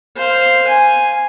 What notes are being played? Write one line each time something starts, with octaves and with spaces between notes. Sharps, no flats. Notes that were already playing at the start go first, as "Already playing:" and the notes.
C5 F5
G#5